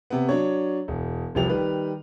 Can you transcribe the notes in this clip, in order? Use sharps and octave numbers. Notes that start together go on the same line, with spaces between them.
C3 B3
F#3 D4 C#5
E1
F1 C2 F3 G4 F7
D#3 G3 B4